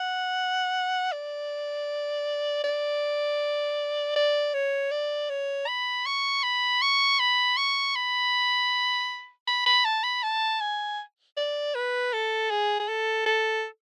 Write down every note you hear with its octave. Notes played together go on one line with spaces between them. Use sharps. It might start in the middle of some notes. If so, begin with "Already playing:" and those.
Already playing: F#5
D5
D5
D5
C#5
D5
C#5
B5
C#6
B5
C#6
B5
C#6
B5
B5
B5
A5
B5
A5
G#5
D5
B4
A4
G#4
G#4
A4
A4